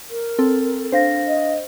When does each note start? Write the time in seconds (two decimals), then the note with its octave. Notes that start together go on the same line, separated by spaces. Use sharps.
0.10 A#4
0.39 C4 A4
0.92 D4 C5 F5 A#6
1.28 D#5